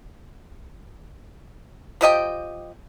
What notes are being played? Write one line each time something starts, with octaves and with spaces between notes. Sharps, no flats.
F3 G4 D#5 G5